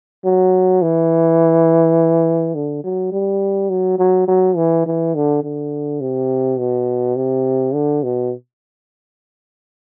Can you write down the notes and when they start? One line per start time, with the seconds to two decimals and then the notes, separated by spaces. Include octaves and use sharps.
0.25 F#3
0.82 E3
2.55 D3
2.84 F#3
3.12 G3
3.70 F#3
3.99 F#3
4.28 F#3
4.56 E3
4.86 E3
5.15 D3
5.43 D3
6.01 C3
6.59 B2
7.16 C3
7.74 D3
8.03 B2